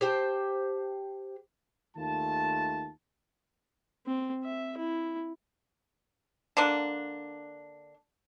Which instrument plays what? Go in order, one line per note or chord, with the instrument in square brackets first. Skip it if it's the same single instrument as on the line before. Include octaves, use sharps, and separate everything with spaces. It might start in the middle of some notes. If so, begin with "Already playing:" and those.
[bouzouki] G4 C5 G5 A5
[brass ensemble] D#2 D#3 A3 F4 A5
[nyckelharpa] C4
E5
E4
[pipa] D3 A#3 D4